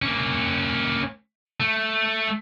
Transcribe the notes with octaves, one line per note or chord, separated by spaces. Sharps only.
A#3 C#4
A3